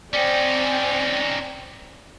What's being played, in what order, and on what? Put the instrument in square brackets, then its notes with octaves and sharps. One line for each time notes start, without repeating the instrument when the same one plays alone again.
[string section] C4 G5 G#5 [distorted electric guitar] C#4 D#4 [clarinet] D5